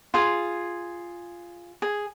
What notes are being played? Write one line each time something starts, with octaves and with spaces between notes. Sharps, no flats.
F4 G#4
G#4